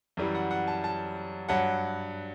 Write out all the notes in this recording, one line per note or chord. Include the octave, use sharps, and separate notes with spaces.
F#2 E3 G3
F#5
F#5
A5
A5
G2 F#3 F#5